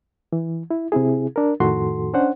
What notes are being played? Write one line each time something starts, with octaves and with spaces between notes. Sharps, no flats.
E3
E4
C3 C4 E4 G#4
D4 A#4
F2 A2 D#3 F#4 A4 C6
C#4 D4 C5 F#5